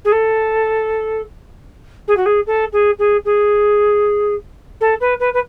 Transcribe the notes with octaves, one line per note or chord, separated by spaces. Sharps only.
G#4
A4
G#4
F#4
G#4
A4
G#4
G#4
G#4
A4
B4
B4
B4